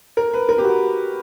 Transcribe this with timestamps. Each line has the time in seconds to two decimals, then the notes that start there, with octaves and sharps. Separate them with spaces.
0.17 A#4
0.33 B4
0.49 A#4
0.58 G4
0.64 F#4